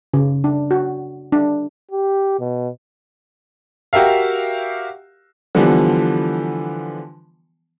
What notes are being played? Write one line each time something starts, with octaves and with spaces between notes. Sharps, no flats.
C#3
D4
F#4
D4
G4
B2
F#4 G4 A#4 E5 F5
D3 E3 F3 G3 B3